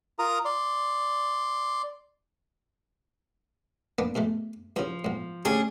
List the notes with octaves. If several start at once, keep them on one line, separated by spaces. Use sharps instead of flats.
F4 A#4 A#5 D#6
D5 C6
A#3 B3 D4
B2 G#3 A3
G2 C#3 F3
B1 G#2
D2 C#4 D4 G4 G#4